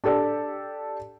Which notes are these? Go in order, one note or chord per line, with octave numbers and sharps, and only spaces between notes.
D4 G4 A4 D5